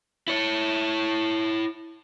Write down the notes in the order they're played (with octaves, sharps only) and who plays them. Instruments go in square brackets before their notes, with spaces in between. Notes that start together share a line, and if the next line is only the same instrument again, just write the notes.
[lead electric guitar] E4 C#5